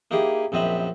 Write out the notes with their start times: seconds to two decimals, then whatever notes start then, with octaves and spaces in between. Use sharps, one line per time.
0.11 A#3 D#4 E4 G4 G#4
0.52 A#1 F#2 C4 D#5 E5 B5